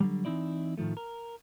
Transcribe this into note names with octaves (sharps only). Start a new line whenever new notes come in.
D3 F#3 G3
E3 C4 D#4 E4 D5
A2 D#3 F3 A3
A#4